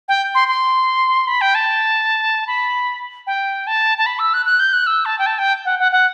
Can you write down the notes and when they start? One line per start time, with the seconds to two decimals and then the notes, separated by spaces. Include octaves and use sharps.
0.08 G5
0.35 C6
0.48 C6
1.27 B5
1.41 G5
1.55 A5
2.47 B5
3.27 G5
3.67 A5
3.98 A5
4.06 B5
4.19 E6
4.34 F#6
4.46 F#6
4.60 G6
4.73 F#6
4.87 E6
5.05 A5
5.19 G5
5.26 A5
5.39 G5
5.65 F#5
5.79 F#5
5.92 F#5